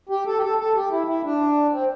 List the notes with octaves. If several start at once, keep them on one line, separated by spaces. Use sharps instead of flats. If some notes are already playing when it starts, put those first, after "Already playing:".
G4
A4
G4
A4
A4
G4
E4
E4
D4
C4